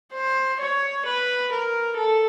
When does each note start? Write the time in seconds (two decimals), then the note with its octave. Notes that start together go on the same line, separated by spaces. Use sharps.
0.14 C5
0.60 C#5
1.06 B4
1.52 A#4
1.97 A4